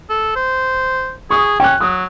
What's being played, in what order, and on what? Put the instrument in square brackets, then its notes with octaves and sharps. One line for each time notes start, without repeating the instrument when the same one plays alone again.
[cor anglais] A4
C5
[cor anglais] G#4 [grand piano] C#6 D#6
[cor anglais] C#4 [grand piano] G5 F#6
[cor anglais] F#3 [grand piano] D#6